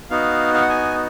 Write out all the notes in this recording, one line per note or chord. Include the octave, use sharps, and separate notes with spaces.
B3 D#4 F#4 F5
F5
F#5
G#5